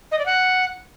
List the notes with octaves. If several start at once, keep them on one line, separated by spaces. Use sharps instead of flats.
D#5
D5
F#5